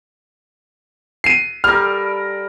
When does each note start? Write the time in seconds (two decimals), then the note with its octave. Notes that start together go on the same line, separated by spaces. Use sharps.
1.24 C7 D#7
1.64 G3 A4 A#4 F6